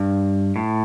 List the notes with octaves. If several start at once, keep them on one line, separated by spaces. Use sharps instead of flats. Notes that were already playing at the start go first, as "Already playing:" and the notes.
Already playing: G2
A2